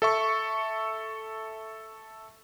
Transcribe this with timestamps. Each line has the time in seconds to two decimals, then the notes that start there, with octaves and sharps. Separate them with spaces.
0.02 A4 E5 C#6